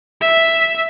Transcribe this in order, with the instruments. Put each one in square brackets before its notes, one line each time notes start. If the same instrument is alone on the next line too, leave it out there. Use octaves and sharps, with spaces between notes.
[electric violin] E5